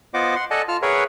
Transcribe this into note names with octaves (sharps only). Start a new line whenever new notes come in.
B3 F4 C5 D#5 F#5 D6
F#5 C6
A4 D5 D#5 F#5 G#5 A5
F4 A5 F6
G#4 A#4 B4 C#5 E5 F#5